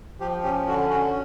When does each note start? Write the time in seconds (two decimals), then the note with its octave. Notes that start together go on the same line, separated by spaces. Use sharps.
0.20 F3 G4
0.43 C#4 G4
0.67 D3 F#4
0.90 C#4 F#4